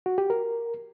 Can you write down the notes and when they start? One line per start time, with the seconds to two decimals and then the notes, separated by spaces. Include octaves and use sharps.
0.06 F#4
0.18 G4
0.30 A#4